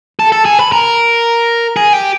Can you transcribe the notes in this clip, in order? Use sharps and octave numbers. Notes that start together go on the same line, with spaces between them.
A4
A4
G#4
B4
A#4
G#4
G4